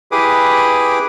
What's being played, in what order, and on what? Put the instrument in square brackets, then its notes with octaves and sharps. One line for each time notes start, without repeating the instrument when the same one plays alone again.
[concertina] E4 G4 G#4 B4 D6 D#6